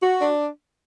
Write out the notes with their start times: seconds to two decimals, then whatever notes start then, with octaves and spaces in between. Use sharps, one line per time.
0.03 F#4
0.21 D4